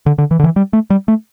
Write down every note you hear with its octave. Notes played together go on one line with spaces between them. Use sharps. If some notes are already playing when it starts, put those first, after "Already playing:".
D3
D3
E3
D3
E3
G3
A3
G3
A3